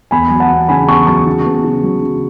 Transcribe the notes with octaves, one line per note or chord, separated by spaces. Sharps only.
E2 G#5 B5
F#3
F#5 A5
E2
C#3 G#5 B5
E2 A5 C#6
F#3 A5 C#6
C#3
B3
C#3
F#3
C#3